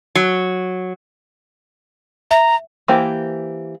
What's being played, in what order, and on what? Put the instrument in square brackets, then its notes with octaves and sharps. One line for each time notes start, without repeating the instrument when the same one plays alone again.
[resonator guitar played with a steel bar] F#3
[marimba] E5 [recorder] A#5
[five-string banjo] E3 A#3 G4 C5